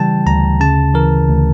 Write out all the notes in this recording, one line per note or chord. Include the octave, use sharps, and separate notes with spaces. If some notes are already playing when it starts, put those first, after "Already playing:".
Already playing: C#3 E3 G3 G5 A5
D2 A#5
C#3 A5
E3 A#4
D2